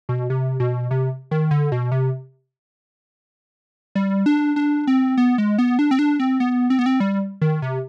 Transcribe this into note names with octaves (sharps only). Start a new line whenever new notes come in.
B2
C3
B2
C3
D#3
D3
B2
C3
G3
D4
D4
C4
B3
G#3
B3
D4
C4
D4
C4
B3
C4
B3
C4
G3
D#3
C3